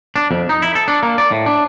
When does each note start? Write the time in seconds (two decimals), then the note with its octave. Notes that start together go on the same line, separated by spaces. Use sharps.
0.16 D4
0.31 F2
0.49 D#4
0.62 E4
0.75 A4
0.88 D4
1.03 A#3
1.18 D5
1.31 A2
1.46 D4